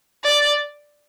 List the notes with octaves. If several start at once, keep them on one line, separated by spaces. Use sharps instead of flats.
D5